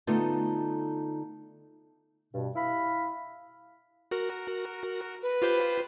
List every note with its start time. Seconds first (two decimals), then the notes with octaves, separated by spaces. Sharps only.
0.07 D3 A3 B3 D#4 F4
2.34 G2 B2
2.56 E4 F5 B5
4.11 F#4 A#4
5.23 B4
5.42 F4 G4 C5